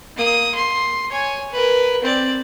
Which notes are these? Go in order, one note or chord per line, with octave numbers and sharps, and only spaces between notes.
A#3 D#6
C6
C#5 G#5
A#4 B4
C4 D5